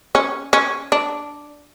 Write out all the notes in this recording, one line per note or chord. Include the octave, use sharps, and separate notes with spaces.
C#4
C#4
D4